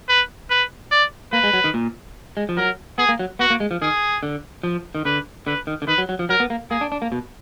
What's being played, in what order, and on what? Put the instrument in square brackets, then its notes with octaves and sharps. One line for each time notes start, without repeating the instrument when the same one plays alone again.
[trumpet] B4
B4
D5
[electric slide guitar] A#3 [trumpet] B4
[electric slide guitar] G#3
F#3
D#3
A#2
G#3
F3
[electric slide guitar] F#3 [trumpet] A#4
[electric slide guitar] B3 [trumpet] G#4
[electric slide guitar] A#3
F#3
[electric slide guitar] B3 [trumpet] F#4
[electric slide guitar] A#3
G#3
F3
[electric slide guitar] D#3 [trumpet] G#4
[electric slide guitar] D3
F3
D#3
[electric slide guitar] D3 [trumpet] B4
[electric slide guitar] D3 [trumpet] B4
[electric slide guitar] D#3
D3
[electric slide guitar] D#3 [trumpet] B4
[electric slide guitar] F#3
F#3
F3
[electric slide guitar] F#3 [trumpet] A#4
[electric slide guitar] B3
A#3
[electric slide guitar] A#3 [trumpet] G#4
[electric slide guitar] D4
D4
A#3
B2